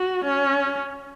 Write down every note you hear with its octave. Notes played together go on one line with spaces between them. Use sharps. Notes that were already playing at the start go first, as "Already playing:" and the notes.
Already playing: F#4
C#4